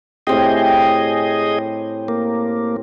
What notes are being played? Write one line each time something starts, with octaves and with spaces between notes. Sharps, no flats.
A2 C4 G4 G#4 D#5
A#3